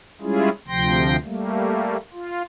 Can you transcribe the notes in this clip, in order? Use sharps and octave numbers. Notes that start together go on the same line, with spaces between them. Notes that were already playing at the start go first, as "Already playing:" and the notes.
G3 G#3 C#4 E4 F4 G#4
D2 C3 F3 G5 C6 A#6
G3 A3 A#3
F4